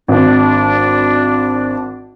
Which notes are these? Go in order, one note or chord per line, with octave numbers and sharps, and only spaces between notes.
G#1 D4